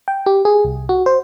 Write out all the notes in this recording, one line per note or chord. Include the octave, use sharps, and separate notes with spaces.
G5
G4
G#4
C2
F#4
C5